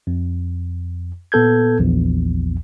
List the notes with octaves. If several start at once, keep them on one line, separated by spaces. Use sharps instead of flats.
F2
A#2 B3 A4 G6 G#6
A#1 E2